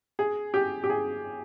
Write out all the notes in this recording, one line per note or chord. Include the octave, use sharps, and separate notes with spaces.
G#4
G4
G4
G#4